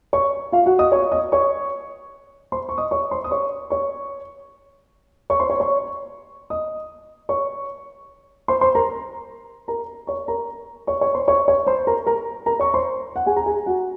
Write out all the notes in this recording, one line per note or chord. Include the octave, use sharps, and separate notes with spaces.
C#5 C#6
F4 F5
F#4 F#5
D#5 D#6
C#5 C#6
D#5 D#6
C#5 C#6
C5 C6
C#6
D#5 D#6
C#5 C#6
C5 C6
D#6
C#5 C#6
C#5 C#6
C#5 C#6
C5 C6
C#5 C#6
C#5 C#6
D#5 D#6
C#5 C#6
C5 C6
C5 C6
A#4 A#5
A#4 A#5
C#5 C#6
A#4 A#5
C#5 C#6
C#5 C#6
C5 C6
C#5 C#6
C#5 C#6
C5 C6
A#4 A#5
A#4 A#5
A#4 A#5
C#5 C#6
C5 C6
F#5
G#4 G#5
A#5
G#4 G#5
F#4 F#5